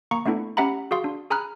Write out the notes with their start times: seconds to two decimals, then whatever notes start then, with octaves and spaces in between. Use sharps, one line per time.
0.11 A#3 A#5 C#6 C#7
0.26 A3 B3 D4 E4 A4
0.57 C#4 G4 E5 F#5 A#5 B5
0.91 F#4 G#4 F5 C6
1.04 D4
1.30 G#4 G#5 A#5 B5 F6 F#6